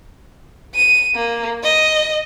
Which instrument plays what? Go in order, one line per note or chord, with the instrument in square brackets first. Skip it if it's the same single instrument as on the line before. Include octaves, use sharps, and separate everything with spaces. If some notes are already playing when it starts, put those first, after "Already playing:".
[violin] D#7
A#3
D#5